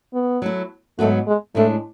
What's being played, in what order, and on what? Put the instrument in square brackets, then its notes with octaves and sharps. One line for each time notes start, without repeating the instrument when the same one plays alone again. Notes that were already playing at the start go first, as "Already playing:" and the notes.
[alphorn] B3
[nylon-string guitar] F#3 A3 E4
[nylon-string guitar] G#2 F#3 B3 F#4 [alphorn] A3
[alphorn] G#3
[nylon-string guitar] A2 G#3 D4 [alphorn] A3